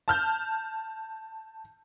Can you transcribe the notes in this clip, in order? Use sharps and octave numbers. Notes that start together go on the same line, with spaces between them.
A5 F6 G6